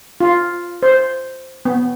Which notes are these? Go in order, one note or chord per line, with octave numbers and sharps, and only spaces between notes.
F4
C5
B3